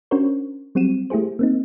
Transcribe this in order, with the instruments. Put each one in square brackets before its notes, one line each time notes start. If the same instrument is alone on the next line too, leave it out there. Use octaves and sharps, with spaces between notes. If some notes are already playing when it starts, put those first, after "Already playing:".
[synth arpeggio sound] C#4 D4 F#4 A#4 C5 C#5
F#3 G3 C4 F#4 D#7 E7
A3 E4 G4 G#4 C5
A#3 C4 D#4